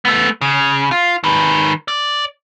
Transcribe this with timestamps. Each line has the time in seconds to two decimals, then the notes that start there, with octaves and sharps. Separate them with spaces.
0.05 A3 B3
0.41 C#3
0.91 F4
1.24 D#3 B4
1.88 D5